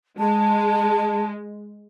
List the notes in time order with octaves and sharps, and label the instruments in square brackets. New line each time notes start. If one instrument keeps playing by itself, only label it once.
[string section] G#3 [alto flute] A5